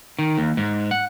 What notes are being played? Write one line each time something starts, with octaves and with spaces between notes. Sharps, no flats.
D#3
D#2
G#2
F#5